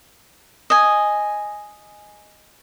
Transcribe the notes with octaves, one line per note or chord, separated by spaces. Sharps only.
D#5 G#5